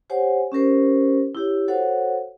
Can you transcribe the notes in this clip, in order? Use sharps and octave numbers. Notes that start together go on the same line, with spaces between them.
G4 C5 C#5 F#5 G#5
C#4 G4 A#4 C5
E4 G4 C#5
F#4 A4 C5 C#5 F5 F#5